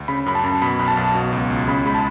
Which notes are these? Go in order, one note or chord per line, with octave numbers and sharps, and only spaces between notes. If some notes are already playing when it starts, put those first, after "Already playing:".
Already playing: D2
C#3 B5
F#2 B5
A5
F#2
B2 B5
B1
A5
B1
B2
C#2
C#2
C#3 B5
G#3 B5
A5